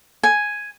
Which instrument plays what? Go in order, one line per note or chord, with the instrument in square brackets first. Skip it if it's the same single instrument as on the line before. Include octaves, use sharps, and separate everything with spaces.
[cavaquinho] G#5